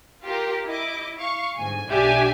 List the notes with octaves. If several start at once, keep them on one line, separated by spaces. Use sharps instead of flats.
F4 G4 A#4
E4 D#5 D6
F5 C#6
G1 G#2 G#5
B1 D4 G4 E5 G#5 D6